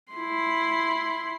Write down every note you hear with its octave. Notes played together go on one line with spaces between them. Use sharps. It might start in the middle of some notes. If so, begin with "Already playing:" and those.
E4 C6